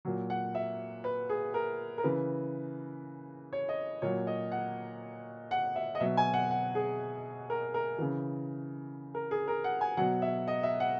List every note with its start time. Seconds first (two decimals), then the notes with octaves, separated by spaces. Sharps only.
0.05 A#2 F#3
0.30 F#5
0.55 E5
1.04 B4
1.29 G#4
1.54 A#4
1.98 A#4
2.03 C#3 E3 B4
3.53 C#5
3.69 D#5
4.02 A#2 F#3 C#5
4.27 D#5
4.52 F#5
5.51 F#5
5.76 E5
5.95 D#5
6.00 B2 F#3 E5
6.17 G#5
6.33 F#5
6.51 F#5
6.75 G#4
7.50 A#4
7.74 A#4
7.98 C#3 E3
9.15 A#4
9.31 G#4
9.48 A#4
9.64 F#5
9.81 G#5
9.97 B2 F#3 F#5
10.22 E5
10.47 D#5
10.63 E5
10.80 F#5